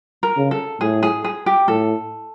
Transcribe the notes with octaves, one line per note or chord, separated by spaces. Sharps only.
A#4
C#3
A4
A2 G#4
G#4
G#4
G4
A2 A4